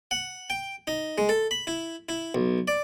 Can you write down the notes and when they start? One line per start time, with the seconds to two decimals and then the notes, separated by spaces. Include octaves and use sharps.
0.11 F#5
0.50 G5
0.87 D#4
1.18 G#3
1.29 A4
1.51 B5
1.67 E4
2.09 E4
2.35 B1
2.68 D5